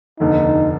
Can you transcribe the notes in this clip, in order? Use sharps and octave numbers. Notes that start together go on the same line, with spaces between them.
F1 D#2 D3 D#4